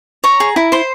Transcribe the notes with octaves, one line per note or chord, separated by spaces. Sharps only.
C#5 A#5
G#4
E4
C5 C6